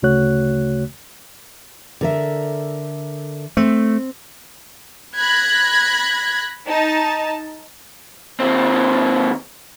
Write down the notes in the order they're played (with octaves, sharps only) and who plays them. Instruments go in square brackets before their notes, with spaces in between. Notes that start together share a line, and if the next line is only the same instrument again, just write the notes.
[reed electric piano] D2 C#3 A3 F#4 C#5 F#6
[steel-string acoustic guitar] D3 A#4 E5
[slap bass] A3 [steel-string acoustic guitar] C4
[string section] B5 F#6 G#6 A#6
D#4 A5
[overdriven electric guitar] D#2 C4